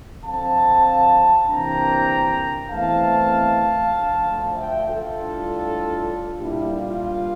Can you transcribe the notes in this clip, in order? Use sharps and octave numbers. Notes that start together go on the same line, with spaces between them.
F2 D3 F3 C4 F5 A5
C3 E3 A#3 D4 G5 A#5
E2 E3 A3 C4 F5 A5
D2 D3 F3
E5 G5
F4 A4
A2 G3 D4
A#2 G3 A#3 D4 E4 G4
D4 F4